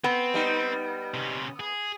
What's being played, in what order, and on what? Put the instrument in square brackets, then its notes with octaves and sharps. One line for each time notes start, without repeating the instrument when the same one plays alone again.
[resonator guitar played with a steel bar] B3 [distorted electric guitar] C4
[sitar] G3 D#4
[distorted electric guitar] C3 C#4
G#4